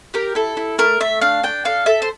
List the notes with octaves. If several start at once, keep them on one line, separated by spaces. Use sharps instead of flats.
G4 A#4
E4 A4
E4
A3 A#4
A3 E5
D4 F5
D4 G5
A4 F5
A4 E5
C5